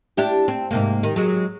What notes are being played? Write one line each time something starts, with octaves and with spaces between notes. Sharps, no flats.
D4 E4 G4
C4
G#2 C3 A#3
D#3
F#3 G#3